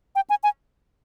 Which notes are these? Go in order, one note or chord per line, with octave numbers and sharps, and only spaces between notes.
G5
G#5
G#5